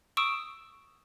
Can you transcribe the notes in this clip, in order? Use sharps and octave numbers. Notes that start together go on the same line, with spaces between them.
C#6 D#6 E6 D7 E7